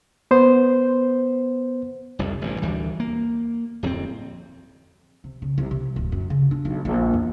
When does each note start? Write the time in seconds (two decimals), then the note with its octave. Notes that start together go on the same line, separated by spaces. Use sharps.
0.31 B3 C5
2.19 F1 C2 F2
2.42 A1 G2 A#2
2.62 D2 E3 G3
3.00 A#3
3.83 D1 F2 F#3 C4
5.24 C3
5.42 C#3
5.58 C2
5.71 C3
5.96 D1
6.12 F#2
6.30 C#3
6.51 D4
6.65 B1
6.85 A#1
7.14 E2